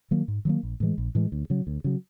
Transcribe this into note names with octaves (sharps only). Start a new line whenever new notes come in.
D#3 F#3 A#3
G#2
D#3 F#3 A#3
A#1
A2 E3 G#3
A#1
A2 E3 G#3
D2
C#3 F#3
D2
C#3 F#3